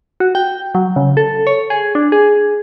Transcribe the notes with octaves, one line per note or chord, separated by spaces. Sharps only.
F#4
G5
F#3
C#3
A4
C#5
G#4
D4
G#4